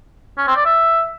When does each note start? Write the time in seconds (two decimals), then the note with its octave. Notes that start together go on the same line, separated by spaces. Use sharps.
0.38 C#4
0.47 C4
0.56 D5
0.65 E5